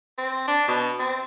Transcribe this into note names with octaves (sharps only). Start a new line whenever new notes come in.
C4
D4
B2
C4